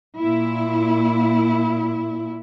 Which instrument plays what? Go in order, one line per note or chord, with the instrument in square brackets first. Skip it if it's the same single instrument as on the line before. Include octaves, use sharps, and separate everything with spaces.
[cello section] A#2 E4